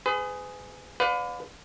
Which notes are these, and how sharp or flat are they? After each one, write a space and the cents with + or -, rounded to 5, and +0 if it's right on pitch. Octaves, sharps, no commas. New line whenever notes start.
G#4 +0 B4 +40
B4 +30 D5 -10 F5 +40